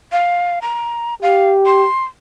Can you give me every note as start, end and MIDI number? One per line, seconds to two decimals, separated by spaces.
0.12 0.59 77
0.62 1.15 82
1.22 1.87 67
1.22 1.50 77
1.66 2.04 84